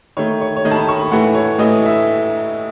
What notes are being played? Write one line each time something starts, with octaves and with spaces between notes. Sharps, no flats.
D#3 A3 C#5
C#5
C#5
D#3 A3 D#5
A5
B5
C#6
B5
A2 E3 A3 F#5
C#5
A2 E3 A3 D#5
E5